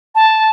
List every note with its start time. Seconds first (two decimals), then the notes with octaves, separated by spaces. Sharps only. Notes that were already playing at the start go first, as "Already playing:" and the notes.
0.15 A5